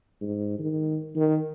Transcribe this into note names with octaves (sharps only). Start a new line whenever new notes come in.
G#2
D#3
D#3